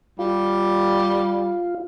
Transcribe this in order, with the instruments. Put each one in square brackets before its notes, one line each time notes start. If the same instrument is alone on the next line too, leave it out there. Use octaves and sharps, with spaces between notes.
[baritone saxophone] G3 [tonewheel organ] F4